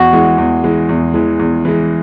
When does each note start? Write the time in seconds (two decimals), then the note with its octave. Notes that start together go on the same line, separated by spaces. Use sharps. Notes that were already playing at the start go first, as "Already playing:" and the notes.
Already playing: E2 F#4
0.13 E3 G#3
0.38 E2
0.64 E3 G#3
0.89 E2
1.14 E3 G#3
1.39 E2
1.65 E3 G#3